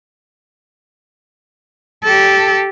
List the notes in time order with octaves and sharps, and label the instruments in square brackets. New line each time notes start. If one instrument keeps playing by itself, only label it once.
[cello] G4 A4